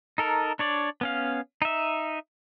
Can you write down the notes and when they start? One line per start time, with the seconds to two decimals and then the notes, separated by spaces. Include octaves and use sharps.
0.18 D#4 A4 A#4
0.59 D4 C#5 D5
1.01 B3 C#4 F5
1.62 D#4 E5